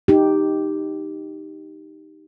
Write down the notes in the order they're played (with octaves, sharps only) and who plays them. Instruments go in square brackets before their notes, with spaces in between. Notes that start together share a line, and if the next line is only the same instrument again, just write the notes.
[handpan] D#4 G4